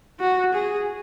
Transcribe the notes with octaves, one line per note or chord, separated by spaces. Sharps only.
F#4
G#4